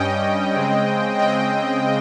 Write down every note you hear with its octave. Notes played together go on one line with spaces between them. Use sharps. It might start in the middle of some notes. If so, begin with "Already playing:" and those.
Already playing: G2 G3 C#4 D#5 G5
C#3 G#3 C4
C#3 G#3 C4 D#5 G5